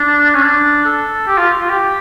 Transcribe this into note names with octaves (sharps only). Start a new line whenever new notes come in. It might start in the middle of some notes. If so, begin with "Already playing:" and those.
Already playing: D4
C#4
D4
A4
G4
F4
F4
G4